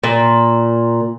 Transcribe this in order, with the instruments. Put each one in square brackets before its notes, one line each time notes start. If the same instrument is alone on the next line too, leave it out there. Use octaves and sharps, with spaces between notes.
[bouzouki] A#2